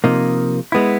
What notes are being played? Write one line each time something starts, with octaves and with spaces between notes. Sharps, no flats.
C3 F3 A#3 D#4
G#3 B3 E4